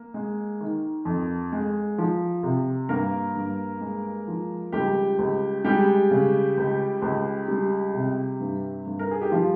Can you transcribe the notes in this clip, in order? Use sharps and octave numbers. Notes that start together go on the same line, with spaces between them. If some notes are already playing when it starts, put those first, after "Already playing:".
Already playing: A#3
G#3
D#3
F2
G#3
F3
C3
G2 A#3 A#4
G2
G#3
F3
C#2 G3 G4
C#2
G3 G#3 G4
C#3
C#2
C#2
G3
C3
G2
G2
A#4
G#4
G4
F3 G3 F4